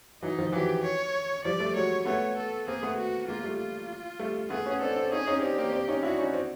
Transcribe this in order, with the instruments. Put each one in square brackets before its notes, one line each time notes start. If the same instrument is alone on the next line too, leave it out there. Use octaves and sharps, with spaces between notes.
[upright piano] E3 F#3 [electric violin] D#4
[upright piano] D#3 F3
[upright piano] E3 F#3 [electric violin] G4
[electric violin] C#5
[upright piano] F3 G3 [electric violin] D5
[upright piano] G3 A3
[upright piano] F#3 G#3 [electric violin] C#5
[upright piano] A3 B3 [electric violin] C#5
[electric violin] A4
[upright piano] A#3 C4 [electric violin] G#4
[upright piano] A3 B3
[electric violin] F#4
[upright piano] G#3 A#3 [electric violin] F4
[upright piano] G3 A3
[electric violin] F4
[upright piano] G3 A3
[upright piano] A3 B3 [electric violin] G#4
[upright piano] B3 C#4
[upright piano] C4 D4 [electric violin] A4
[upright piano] C4 D4
[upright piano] C#4 D#4 [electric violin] G#4
[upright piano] C#4 D#4
[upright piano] C4 D4 [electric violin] G4
[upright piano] A#3 C4
C4 D4
C#4 D#4
[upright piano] D4 E4 [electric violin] F#4
[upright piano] C#4 D#4
C4 D4